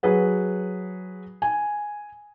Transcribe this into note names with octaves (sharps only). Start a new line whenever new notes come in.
F#3 G#4 B4 F#5
G#5